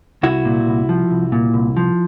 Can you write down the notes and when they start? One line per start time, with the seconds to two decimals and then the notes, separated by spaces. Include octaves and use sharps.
0.23 C2 E4 F#4
0.45 A#2
0.67 C2
0.89 F3
1.11 C2
1.32 A#2
1.54 C2
1.77 F3